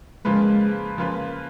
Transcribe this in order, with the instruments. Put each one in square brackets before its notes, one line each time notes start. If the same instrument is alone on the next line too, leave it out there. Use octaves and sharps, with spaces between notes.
[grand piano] C#3 F3 A#3 F4 B4 [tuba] G#3
[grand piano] C#3 F3 A#3 F4 B4